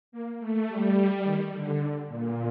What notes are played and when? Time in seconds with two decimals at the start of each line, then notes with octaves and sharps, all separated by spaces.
0.12 A#3
0.40 A3
0.67 G3
1.24 D#3
1.52 D3
2.08 A#2